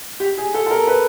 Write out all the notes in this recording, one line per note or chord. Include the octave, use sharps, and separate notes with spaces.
G4
G#4
A4
A4
A#4
B4